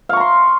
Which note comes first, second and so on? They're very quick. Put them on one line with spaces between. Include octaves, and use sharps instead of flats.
F5 C#6 A#5 C6